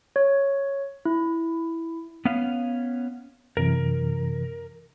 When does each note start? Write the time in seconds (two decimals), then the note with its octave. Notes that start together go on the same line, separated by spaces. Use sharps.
0.16 C#5
1.05 E4
2.25 B3 C#4 F5
3.57 F#2 C3 E3 A#4